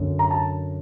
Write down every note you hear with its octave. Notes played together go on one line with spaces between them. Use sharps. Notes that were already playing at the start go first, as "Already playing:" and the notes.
Already playing: F#2 D3
A#5
A5